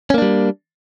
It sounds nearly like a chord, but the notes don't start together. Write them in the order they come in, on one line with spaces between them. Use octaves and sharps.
C#4 A#3 D4 G3